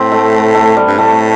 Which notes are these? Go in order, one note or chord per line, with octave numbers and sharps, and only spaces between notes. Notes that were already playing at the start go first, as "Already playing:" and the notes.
Already playing: A2 C4
A3
A3
G3
G2
A2 A3